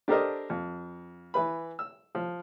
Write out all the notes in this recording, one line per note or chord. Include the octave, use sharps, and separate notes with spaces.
D4 G4 A4 A#4 C5 D#5
F2
E3 B4 B5
E6
F3